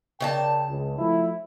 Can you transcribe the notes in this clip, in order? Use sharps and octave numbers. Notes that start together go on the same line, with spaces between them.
C#3 A#4 D5 D#5 G5 A5
C#2
F3 A3 E4